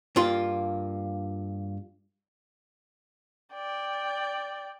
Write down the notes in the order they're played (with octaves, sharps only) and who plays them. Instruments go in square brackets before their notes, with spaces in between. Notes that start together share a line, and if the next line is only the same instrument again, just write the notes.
[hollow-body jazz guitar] G2 A#3 F4 C6
[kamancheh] D5 G5